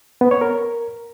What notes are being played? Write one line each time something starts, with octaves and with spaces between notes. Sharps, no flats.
B3
C#5
A#4